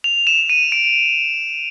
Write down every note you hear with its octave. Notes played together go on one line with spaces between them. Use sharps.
F7
E7
D#7
D7